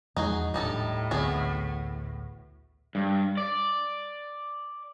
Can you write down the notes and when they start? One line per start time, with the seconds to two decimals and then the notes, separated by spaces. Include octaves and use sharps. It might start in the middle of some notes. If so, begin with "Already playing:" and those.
0.17 E2 F3 G#3 D#4 F#4 G#4
0.54 D#1 A2 G3 D4 D#4 A4
1.11 A1 D2 B3 C4 F#4 G#4
2.95 G2
3.37 D5